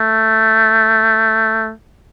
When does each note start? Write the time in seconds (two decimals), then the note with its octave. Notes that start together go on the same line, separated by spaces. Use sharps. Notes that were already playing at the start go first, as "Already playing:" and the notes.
Already playing: A3